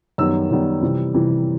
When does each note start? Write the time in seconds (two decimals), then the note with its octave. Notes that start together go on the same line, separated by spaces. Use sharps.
0.18 F#2 D#3 G3 B3 E6
0.51 F#2 D#3 G3 B3
0.82 C3 E3 G3
1.14 C3 E3 G3